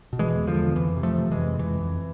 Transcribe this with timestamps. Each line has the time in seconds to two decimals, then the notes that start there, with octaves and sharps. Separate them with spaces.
0.13 B2
0.19 E3 G#3
0.34 E2
0.47 D3 F3
0.54 E2
0.75 F2 E3
0.96 C3
1.03 F3 A3
1.17 C3
1.31 E3 G#3
1.38 F2
1.59 F2 E3
1.80 F2